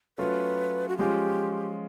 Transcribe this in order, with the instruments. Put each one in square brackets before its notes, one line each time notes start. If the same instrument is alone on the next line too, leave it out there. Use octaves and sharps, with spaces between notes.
[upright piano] F#3 A3 C#4 F4 [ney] B4
[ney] F#4
[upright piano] F3 G#3 C#4 F4 [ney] G4